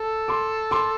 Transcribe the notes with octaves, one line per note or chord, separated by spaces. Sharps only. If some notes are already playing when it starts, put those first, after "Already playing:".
Already playing: A4
C6 D6
C6 D6